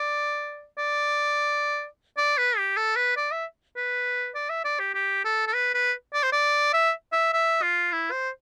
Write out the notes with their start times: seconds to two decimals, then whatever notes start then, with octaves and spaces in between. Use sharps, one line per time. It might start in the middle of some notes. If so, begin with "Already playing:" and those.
Already playing: D5
0.78 D5
2.17 D5
2.38 B4
2.57 G4
2.77 A4
2.96 B4
3.17 D5
3.32 E5
3.76 B4
4.35 D5
4.50 E5
4.65 D5
4.79 G4
4.94 G4
5.25 A4
5.47 A4
5.54 B4
5.74 B4
6.14 D5
6.23 C5
6.32 D5
6.73 E5
7.12 E5
7.33 E5
7.62 F4
7.92 E4
8.11 C5